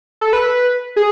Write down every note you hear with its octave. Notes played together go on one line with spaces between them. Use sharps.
A4
B4
G#4